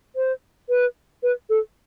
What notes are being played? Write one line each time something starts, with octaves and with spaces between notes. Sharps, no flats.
C5
B4
B4
A4